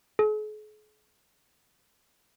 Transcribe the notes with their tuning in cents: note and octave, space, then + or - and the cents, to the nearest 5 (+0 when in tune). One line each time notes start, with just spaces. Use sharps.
G#4 +45